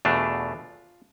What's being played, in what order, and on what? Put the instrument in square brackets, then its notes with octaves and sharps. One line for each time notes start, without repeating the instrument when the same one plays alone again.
[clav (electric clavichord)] E2 B2 A3 D4 F4